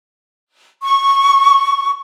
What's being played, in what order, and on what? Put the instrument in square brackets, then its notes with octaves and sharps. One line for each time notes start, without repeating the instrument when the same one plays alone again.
[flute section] C#6